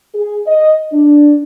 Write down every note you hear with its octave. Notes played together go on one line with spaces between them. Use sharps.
G#4
D#5
D4